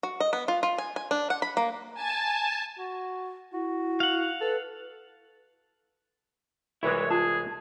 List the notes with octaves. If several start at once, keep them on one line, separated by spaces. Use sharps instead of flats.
F#4
D#5
B3
F4
F4
G#5
G#5
D4
F#5
B5
A#3
G#5 A5
F#4
E4 F#4
F5 F#5
A4 B4
C2 E3 G#3 E4 F4 B4 C#5
F4 G#4 A5